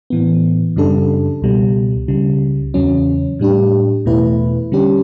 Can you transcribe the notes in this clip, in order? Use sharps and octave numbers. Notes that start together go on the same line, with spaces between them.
A2 E3 B3
F#2 C#3 G3 D4 A4
C#2 B2 G3
C#2 C#3 G3
E2 C#3 F#3 C#4
A2 G3 D4 G4
E2 B2 A3 E4 B4
D3 G3 C#4 G4